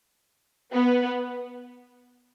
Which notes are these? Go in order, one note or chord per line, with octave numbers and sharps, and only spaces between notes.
B3